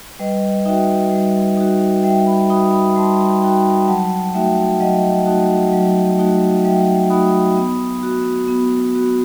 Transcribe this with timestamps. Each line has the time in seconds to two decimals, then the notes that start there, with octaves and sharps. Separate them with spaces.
0.19 G3 B4 D#5
0.65 D#4 F#4 E5 G5
1.11 G3
1.57 D#4 F#4
2.03 G3 E5 G5
2.26 G5 B5
2.50 D#4 F#4 B5 D#6
2.72 B5 D#6
2.96 G3 A5 C6
3.42 D#4 F#4 G5 B5
3.87 F#3 F#5 A5
4.34 A3 D#4 F#4 E5 G5
4.80 F#3 D#5 F#5
5.26 A3 D#4 F#4
5.73 F#3
6.19 A3 D#4 F#4
6.64 F#3 E5 G5
7.10 A3 D#4 F#4 B5 D#6
7.57 B3
8.03 F#4
8.48 B3
8.95 F#4